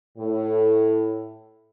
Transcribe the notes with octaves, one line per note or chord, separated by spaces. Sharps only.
A2